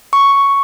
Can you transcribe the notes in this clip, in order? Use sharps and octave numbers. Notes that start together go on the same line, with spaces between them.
C#6